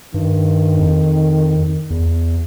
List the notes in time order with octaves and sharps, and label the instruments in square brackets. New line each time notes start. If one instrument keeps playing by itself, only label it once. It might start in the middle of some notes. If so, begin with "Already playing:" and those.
[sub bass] G2 [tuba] D#3
[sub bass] F2
E2